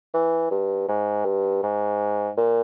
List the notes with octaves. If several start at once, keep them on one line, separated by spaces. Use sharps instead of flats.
E3
G2
G#2
G2
G#2
A#2